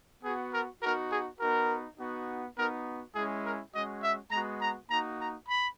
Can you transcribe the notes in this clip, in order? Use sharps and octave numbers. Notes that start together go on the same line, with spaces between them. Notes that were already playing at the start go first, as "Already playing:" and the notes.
B3 F#4 G#4
A#4
B3 D#4 F#4 A#4
G#4
B3 D#4 F#4 A#4
B3 D#4 F#4
B3 D#4 F#4 A#4
G#3 C#4 E4 G#4
A#4
G#3 C#4 F#4 D#5
E5
G#3 B3 F#4 A#5
A#5
A#3 D#4 F#4 A#5
A#5
B5